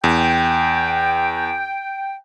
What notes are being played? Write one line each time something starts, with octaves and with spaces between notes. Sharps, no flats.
E2 G5